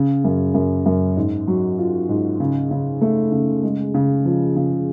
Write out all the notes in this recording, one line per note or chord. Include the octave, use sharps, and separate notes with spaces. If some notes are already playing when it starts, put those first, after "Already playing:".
Already playing: C#3
F#2
F#2
F#2
G#2
F#3
F4
G#2
C#3
C#3
A3
C#3
G#3
C#3
F3
C#3